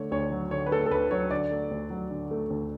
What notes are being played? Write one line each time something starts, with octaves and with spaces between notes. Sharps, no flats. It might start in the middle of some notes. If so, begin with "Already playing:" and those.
Already playing: D3 A3 C#5
D2 C#5
F#3
D3 C#5
B4
A3 A4
A4
D2 B4
F#3 C#5
D3 D5
A3
D2
F#3
D3
A3
D2